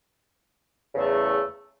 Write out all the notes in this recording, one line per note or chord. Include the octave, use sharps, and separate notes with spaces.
E2 C#3 A3